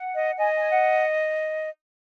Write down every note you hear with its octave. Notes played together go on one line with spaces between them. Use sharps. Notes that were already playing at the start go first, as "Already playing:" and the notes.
Already playing: F#5
D#5
D#5 G#5
G#5
F#5